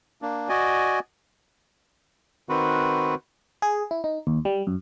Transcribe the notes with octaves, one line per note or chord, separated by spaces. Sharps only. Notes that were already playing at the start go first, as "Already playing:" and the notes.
A#3 D4
F#4 D5 D#5 G#5
D#3 C4 F#4 B4
G#4
E4
D#4
D#2
G3
F#2